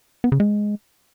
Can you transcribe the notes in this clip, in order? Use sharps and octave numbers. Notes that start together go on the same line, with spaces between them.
B3
C#3
G#3